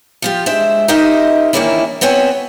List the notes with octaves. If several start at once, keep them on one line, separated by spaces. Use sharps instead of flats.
F3 F4 G4
G#3 D4 C5 E5
D#4 G4 A#4 C5 D#5 E5
D#3 E3 A#3 C#4 D4 E4
B3 C4 F#4 C#5 G#5